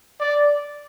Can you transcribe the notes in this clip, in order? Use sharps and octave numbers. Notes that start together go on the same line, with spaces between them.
D5